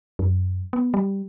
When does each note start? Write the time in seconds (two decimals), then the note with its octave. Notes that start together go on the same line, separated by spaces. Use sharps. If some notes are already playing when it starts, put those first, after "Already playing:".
0.19 F#2
0.73 B3
0.94 G3